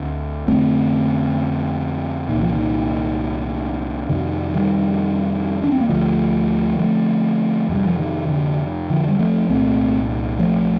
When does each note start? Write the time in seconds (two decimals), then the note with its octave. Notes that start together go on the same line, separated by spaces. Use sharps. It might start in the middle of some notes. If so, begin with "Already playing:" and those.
Already playing: D2 D3 A3 C4
0.48 F2 D3 A3 C4
2.29 C2 A#2 D#3
2.41 F3
2.54 D#3
4.09 F2 C3 D#3
4.54 D#3 G3
5.64 D4
5.72 C4
5.80 A#3
5.89 D2 D3 F3 A3
6.79 F3 A3
7.69 F2 C3 G3
7.86 F3
7.99 D#3
8.29 D3
8.90 D3 F3
9.08 G3
9.19 F3 A3
9.50 C2 A#2 A3 C4
10.39 F3 A3